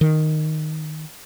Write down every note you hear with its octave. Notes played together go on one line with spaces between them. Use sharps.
D#3